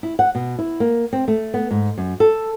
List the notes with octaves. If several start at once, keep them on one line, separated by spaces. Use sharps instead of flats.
E4
F#5
B2
E4
A#3
C4
A3
B3
G#2
F#2
A4